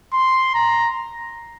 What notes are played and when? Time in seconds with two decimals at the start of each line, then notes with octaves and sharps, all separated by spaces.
0.13 C6
0.55 A#5